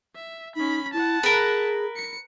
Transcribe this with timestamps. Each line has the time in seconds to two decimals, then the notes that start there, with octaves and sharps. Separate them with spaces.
0.15 E5
0.56 C#4 D#4 B5
0.93 E4 F#5 A5
1.23 G#4 A#4 B4
1.96 C#7